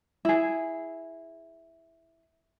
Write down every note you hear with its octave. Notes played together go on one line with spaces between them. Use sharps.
E4 G#4